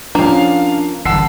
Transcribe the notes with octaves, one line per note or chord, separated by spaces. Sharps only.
F3 A#3 C#4 D4 F5
G1 D3 E3 F#5 A5 E6 C7